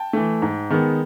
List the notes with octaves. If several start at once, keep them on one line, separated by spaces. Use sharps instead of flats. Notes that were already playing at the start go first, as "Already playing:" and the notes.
Already playing: G5 A5
E3 A3
G#2
D#3 G#3 B3